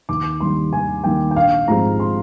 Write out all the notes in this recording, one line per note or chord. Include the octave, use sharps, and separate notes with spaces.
D#2 D6
D#3 G3 A#3 C6
D#2 G#5
D#3 G3 A#3 G5
G5
A#1 F5
G#2 F3 G#3 C4 A#5
C6